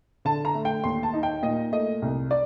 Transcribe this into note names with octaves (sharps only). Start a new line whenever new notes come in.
D3 A5
A#5
A3
G5
D#2 C6
A5
D#4
G5
A#2 D#5
A3 D#5
C2
D5